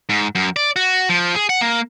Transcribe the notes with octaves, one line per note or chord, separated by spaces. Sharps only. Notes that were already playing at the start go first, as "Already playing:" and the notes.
G#2
F#2
D5
F#4
F3
G#4
F#5
A#3